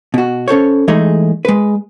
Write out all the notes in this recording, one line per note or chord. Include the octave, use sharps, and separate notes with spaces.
B2 F#4
C#4 A4 C5 C#5
E3 G#3 A3 D#4 G#4
G#3 B4